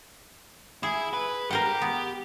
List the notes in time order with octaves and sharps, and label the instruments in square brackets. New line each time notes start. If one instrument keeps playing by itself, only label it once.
[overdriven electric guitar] E4 [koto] G#4
[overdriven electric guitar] B4
[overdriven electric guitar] G4 [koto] A#4 C5 F#5
[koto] B3